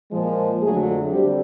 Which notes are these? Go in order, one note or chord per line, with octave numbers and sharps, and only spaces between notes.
A#2 F3 G#3
F2 D3 F#3 A3 G#4
D3 G3 C4 G4